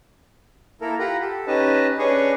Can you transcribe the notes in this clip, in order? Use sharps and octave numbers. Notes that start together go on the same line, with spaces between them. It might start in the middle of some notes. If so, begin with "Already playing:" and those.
A#3 E4 A4 A#4
F4 G4 F#5 A#5 B5
G4 A4
C#4 D#4 G4 B4 D#5 A5
C#4 D4 G#4 B4 C#5 D#5